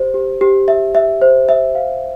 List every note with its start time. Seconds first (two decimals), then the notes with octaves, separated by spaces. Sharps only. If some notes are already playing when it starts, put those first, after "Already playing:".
Already playing: G4 C5
0.14 G4
0.41 G4
0.68 E5
0.95 E5
1.22 C5
1.49 E5
1.75 F5